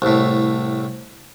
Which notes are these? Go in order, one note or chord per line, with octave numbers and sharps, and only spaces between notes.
C2 A2